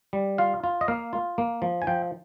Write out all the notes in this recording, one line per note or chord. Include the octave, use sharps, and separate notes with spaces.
G3
F4 F5
F4
D#5
A#3 F5
F4
A#3
F3
G#5
F3 G5